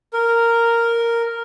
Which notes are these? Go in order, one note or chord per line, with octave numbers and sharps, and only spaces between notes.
A#4